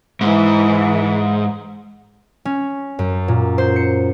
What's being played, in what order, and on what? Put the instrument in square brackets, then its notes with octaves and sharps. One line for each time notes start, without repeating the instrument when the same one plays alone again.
[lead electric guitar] G#2 [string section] E3
[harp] C#4
F#2
A#2
C5
C#7